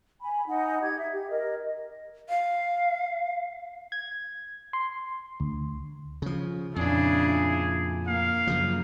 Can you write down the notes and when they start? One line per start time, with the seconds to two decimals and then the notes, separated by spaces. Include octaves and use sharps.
0.21 G#5 B5
0.48 D#4 F#5
0.82 G4 G#6
0.98 E5
1.12 G4
1.30 A#4 D#5
2.29 F5
3.92 G#6
4.73 C6
5.40 D2
6.22 C#3 F3
6.76 F2 A#2 C#3 D4 E4 G#4
8.07 A#3 F5
8.47 F#2 C#3 F3